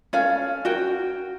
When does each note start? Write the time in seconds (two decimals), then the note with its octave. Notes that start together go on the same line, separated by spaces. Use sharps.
0.13 C#4 A4 F5
0.65 F#4 A#4 G5